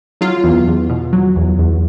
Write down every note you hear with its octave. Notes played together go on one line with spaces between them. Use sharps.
F#3 F4
E2
E2
B2
F#3
E2
E2